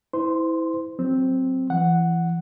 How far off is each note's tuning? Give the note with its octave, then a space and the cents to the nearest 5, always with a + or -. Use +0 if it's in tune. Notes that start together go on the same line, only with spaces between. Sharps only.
E4 -20 C5 -40 C6 +0
F#3 +0 C4 +0
E3 +30 F#5 +0